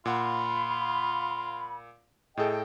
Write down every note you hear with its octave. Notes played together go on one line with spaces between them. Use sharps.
A#2 F4 F#5 B5
A2 G#4 A4 D#5 G5